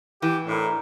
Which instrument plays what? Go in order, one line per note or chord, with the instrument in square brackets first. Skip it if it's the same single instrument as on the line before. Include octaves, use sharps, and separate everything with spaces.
[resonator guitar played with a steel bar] E3 [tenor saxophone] G4 [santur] F#5
[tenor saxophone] A2 [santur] D4 E4 A#4